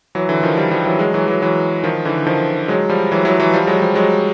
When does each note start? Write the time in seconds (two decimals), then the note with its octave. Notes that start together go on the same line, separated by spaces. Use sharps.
0.15 E3 F#3
0.29 D3 E3
0.43 D#3 F3
0.57 F3 G3
0.71 F3 G3
0.86 E3 F#3
0.99 F#3 G#3
1.14 E3 F#3
1.27 E3 F#3
1.42 E3 F#3
1.84 D#3 F3
2.05 D3 E3
2.27 D#3 F3
2.68 F#3 G#3
2.89 F3 G3
3.12 E3 F#3
3.25 E3 F#3
3.39 E3 F#3
3.54 F3 G3
3.67 F#3 G#3
3.82 F3 G3
3.95 F#3 G#3